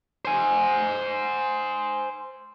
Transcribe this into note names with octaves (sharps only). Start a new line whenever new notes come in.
C5 G#5